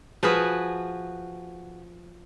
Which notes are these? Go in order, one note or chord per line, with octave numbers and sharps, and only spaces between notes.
F3 F#4 G#4 B4